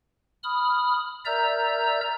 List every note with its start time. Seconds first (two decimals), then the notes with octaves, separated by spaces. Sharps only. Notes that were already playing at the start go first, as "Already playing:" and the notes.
0.43 B5 D#6 F6
1.25 A#4 D5 E5 A#5 E6 G6